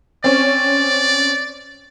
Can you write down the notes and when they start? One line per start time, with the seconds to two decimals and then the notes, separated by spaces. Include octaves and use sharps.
0.24 C4 C#4 D5